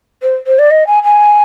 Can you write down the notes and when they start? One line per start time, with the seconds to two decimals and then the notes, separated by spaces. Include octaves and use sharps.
0.22 C5
0.46 C5
0.58 D5
0.70 D#5
0.86 G#5
1.03 G#5